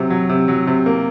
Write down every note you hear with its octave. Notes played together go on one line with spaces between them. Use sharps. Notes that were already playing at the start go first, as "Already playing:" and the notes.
Already playing: C3 F#3
F#3
C3
F#3
C3
A#3